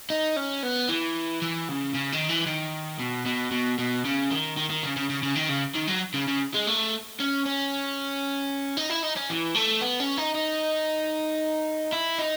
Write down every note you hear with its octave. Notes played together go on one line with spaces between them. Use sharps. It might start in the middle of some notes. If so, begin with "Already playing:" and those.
D#4
C#4
B3
E3
E3
C#3
C#3
D#3
E3
D#3
B2
B2
B2
B2
C#3
D#3
D#3
D#3
C#3
C#3
C#3
C#3
D#3
C#3
D#3
F#3
C#3
C#3
G#3
A3
C#4
C#4
D#4
E4
D#4
C#4
E3
A3
B3
C#4
D#4
D#4
E4
D#4